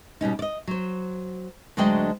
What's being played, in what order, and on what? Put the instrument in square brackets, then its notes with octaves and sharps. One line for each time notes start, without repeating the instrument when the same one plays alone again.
[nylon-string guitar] B2 G3 C#4 D#4
D5 D#5
F#3 C5
D2 F#3 G#3 D4 D#5 G5